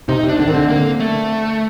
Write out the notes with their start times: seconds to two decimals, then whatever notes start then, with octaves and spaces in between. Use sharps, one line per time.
0.09 C3 D#4
0.23 C3
0.29 D4
0.39 D3 D4
0.48 D#3 C4
0.54 D3
0.69 A#3
1.00 A3